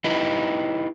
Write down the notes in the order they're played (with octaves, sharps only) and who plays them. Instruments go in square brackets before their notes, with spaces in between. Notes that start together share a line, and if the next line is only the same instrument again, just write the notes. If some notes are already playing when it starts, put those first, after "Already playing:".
[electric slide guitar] D#4 E4 G4 B4 D#5